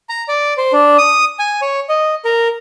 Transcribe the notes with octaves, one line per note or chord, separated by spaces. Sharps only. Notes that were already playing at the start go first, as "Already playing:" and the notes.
A#5
D5
C5
D4
D#6
G#5
C#5
D#5
A#4